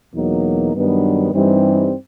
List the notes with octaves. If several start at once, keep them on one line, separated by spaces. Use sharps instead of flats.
E2 B2 F#3 A#3 D#4
G2 D#3 F#3 B3 D4
G2 E3 G3 C4 D#4